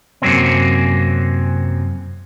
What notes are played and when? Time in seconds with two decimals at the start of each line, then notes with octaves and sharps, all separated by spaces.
0.22 F#2 C3 F#3 A#3 C4 C#4